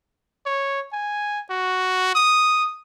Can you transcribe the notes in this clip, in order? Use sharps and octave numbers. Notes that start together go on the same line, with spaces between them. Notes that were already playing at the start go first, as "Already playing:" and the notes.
C#5
G#5
F#4
D#6